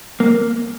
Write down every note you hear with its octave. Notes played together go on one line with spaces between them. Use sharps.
A#3